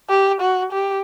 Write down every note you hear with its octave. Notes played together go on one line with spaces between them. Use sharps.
G4
F#4
G4